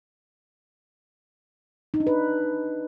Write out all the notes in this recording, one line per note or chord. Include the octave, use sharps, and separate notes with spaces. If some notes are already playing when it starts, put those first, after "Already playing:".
D#4
D4
B4